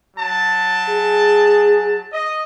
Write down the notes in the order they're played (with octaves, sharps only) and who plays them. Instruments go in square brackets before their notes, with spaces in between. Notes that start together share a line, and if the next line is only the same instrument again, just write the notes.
[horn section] F#3 A5
[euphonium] G#4
[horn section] D#5